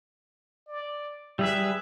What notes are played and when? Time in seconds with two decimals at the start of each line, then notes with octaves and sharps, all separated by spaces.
0.68 D5
1.39 G3 G#4 B4 E5